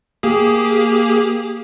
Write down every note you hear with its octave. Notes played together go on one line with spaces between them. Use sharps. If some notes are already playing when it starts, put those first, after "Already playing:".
A#3 G4 G#4